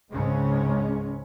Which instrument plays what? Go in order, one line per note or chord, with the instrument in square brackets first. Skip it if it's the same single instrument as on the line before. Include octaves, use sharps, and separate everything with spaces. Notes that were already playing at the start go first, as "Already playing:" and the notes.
[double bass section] C#2 G#2 C#3 G#3 C4 C#4